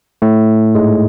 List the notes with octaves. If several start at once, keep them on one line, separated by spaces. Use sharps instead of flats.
A2 A3
G#2 G#3